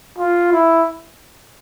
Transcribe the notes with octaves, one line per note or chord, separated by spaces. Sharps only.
F4
E4